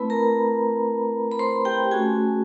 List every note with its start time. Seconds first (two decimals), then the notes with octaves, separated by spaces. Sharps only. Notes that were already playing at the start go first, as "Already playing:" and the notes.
Already playing: A3 C4 E4 B4 B5
0.10 A#4 A#5
1.32 B5
1.39 C5 C6
1.65 G4 G5
1.91 A3 C#4 F#4 G#4 G#5